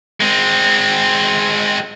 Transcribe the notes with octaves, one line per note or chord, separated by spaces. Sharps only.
G#3 C4